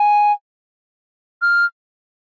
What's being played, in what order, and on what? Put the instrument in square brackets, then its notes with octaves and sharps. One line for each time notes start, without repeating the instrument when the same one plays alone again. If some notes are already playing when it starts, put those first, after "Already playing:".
Already playing: [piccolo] G#5
F6